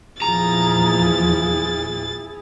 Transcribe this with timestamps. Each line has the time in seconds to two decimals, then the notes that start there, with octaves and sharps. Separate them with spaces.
0.22 E2 A#2 F3 E4 G#4 A#5 A6